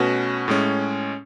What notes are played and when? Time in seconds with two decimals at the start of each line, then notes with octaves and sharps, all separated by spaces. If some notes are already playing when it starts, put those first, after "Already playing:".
Already playing: B2 A3 C#4 F#4 B4
0.48 A2 G#3 C#4